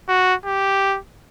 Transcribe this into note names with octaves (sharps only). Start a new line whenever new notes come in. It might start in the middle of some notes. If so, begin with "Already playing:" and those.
F#4
G4